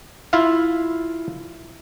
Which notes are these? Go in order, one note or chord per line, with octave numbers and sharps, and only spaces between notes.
E4 F4 E5 F5